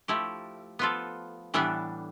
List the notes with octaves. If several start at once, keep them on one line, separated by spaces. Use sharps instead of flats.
F3 A3 E4 G4
F3 B3 F4 A4
A2 E3 G3 B3 D4